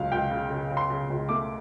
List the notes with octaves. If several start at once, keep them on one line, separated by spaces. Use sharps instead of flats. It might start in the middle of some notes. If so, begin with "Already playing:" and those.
Already playing: C#2 F#3 F5
C#2 G5
C#3
C#3
C#3
C6
C#3
C#2
A3 D6